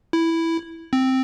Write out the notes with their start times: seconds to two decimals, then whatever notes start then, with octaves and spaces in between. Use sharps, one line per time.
0.13 E4
0.93 C4